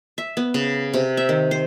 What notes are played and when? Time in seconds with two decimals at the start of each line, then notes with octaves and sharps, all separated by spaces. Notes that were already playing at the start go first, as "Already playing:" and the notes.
0.18 E5
0.37 B3
0.54 C#3
0.94 C3
1.17 E5
1.29 D#3
1.51 C5